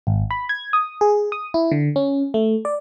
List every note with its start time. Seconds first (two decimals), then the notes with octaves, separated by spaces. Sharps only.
0.07 G#1
0.31 B5
0.49 G#6
0.73 D#6
1.01 G#4
1.32 D#6
1.54 E4
1.72 D3
1.96 C#4
2.34 A3
2.65 D5